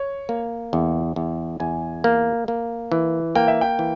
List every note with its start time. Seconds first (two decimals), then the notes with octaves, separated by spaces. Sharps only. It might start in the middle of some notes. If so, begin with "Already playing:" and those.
Already playing: C#5
0.29 A#3
0.73 E2
1.16 E2
1.60 E2 G#5
2.04 A#3
2.48 A#3
2.92 E3
3.35 A#3 G5
3.48 E5
3.61 G5
3.79 E3